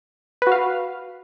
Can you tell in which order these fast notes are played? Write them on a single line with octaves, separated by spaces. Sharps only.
B4 F#4 F5